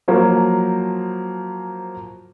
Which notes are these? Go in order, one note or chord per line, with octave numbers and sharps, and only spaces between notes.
F3 F#3 A#3